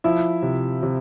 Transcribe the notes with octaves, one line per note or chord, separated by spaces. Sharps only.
F3 E4 E5
C3
C3